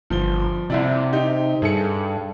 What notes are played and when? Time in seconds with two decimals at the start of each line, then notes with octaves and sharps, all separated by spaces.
0.10 G1 F3 G7
0.70 C2 C3 E4 D5
1.13 D#4 G4
1.62 G2 G#4 A4 C#7